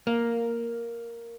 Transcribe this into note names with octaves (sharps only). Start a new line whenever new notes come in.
A#3